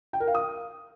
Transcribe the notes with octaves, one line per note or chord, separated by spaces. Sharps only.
G5
A#4
F5
D#6